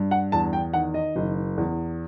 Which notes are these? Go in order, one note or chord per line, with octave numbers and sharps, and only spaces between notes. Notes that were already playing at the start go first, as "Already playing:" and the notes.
Already playing: G2
F#5
E2 A5
G5
D#3 F#5
D#5
F#1
E2